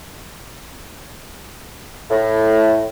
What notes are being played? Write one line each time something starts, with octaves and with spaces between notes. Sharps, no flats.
A2